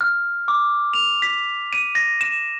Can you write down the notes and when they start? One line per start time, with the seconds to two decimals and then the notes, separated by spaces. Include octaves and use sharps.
0.01 F6
0.48 D6
0.93 F7
1.22 B6
1.73 D#7
1.95 A#6
2.21 E7